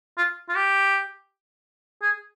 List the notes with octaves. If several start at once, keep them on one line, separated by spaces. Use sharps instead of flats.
F4
F4
G4
G#4